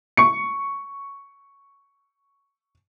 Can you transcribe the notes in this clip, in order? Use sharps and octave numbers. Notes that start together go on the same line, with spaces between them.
C#6 C#7